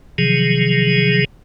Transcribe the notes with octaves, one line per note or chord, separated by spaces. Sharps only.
C3 D#3 F3 F#3 G#4